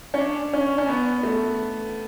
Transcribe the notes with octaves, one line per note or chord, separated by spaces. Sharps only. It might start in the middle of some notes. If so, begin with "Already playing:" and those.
C#4
D4
C#4
C#4
B3
A3